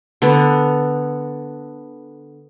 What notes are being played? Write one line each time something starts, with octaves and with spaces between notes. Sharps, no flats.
D3 B3